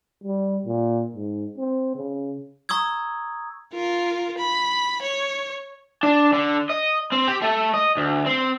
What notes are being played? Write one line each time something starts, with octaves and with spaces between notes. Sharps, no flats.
G3
A#2
G#2
C4
C#3
A#5 C#6 D#6 E6 G#6
F4 A#4
B5
C#5
D4
D3
D#5
C4
G4
A3
D#5
D2
C4